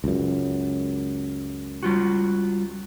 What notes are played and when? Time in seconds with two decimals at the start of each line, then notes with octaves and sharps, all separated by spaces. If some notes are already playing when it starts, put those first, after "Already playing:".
0.04 C#2 F#2
1.83 G3 F4 F#4